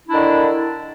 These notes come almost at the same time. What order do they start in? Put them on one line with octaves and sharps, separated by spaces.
D4 E4 D#3 D3